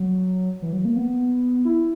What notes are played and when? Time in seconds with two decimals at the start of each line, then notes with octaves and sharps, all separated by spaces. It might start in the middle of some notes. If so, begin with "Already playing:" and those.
Already playing: F#3
0.62 E3
0.73 F#3
0.85 A#3
0.96 B3
1.65 E4